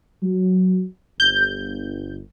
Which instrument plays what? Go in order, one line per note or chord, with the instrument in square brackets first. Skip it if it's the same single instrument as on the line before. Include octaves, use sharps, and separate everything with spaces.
[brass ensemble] F#3
[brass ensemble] G1 [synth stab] G6